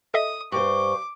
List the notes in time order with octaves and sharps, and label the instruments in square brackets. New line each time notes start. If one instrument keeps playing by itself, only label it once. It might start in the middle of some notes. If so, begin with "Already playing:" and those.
[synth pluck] A4 D#5 E5 [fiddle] D#6
[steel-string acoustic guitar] G2 C5 [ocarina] C#6 [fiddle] D6